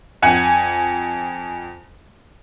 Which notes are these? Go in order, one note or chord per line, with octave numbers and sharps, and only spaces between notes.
F2 F#5 G#5